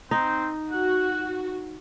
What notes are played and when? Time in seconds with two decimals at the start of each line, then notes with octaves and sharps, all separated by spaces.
0.11 C4 D#4
0.71 F#4 F#5